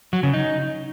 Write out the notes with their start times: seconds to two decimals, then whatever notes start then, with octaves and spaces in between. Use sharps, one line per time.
0.13 F#3
0.23 C#3
0.34 D#4